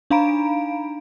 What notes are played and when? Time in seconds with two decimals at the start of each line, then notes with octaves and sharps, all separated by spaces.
0.11 D4 D#4 F5 A#5 B5 D7